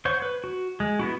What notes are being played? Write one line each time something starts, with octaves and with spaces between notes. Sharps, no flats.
C5 C#5 F#5 C#6
B4
F#4
G#3
B3 E4 F#4